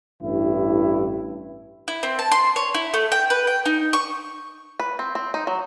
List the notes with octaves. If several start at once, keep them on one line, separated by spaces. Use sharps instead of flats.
A1 G2 E4
E4
C4
A5
C6
C#5
E4
A3
G5
B4
G5
D#4
C#6
B4
C4
C4
D#4
F#3